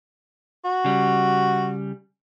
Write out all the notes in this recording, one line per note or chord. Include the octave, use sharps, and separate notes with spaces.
F#4
C#3 G3